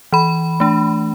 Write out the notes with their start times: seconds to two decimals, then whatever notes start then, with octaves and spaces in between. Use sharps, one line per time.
0.12 E3 B5
0.60 A3 D4